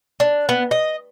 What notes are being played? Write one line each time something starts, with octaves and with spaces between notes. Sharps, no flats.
D4
B3
D#5